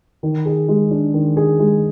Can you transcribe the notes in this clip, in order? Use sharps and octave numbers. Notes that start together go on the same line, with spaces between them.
D#3
G#4
G#3
D4
D#3
G#4
G#3